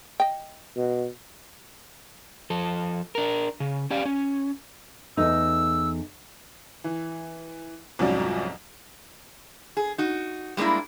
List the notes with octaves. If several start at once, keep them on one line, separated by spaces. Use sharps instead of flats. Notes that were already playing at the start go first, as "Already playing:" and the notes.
D#5 G5
B2
F3 A4
D4 A#4
C#3
C#4 G4 D5 F5
C#4
E2 A3 D#4 E6
E3
C2 F2 G#2 F#3 C#4 D5
G#4
D#4 F#4
G3 G#3 A#3 D4 E4